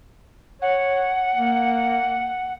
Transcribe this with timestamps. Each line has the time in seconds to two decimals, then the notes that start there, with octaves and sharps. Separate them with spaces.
0.62 C#5 F#5
1.36 A#3